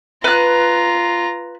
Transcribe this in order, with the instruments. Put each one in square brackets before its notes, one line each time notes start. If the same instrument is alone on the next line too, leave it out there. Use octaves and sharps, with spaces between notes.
[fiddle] F4 A#5 [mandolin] B4 F#6